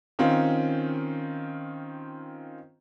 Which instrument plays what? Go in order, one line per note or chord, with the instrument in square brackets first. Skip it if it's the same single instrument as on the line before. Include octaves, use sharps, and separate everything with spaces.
[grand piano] D#3 C4 C#4 F4